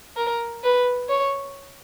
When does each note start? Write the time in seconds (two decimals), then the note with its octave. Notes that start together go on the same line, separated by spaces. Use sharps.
0.17 A#4
0.64 B4
1.09 C#5